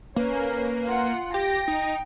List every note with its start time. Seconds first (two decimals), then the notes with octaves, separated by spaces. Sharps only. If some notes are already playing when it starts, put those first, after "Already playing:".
0.16 A#3 C#4 B4
0.87 F4 F#5
1.34 G4 G5 A#6
1.68 D#4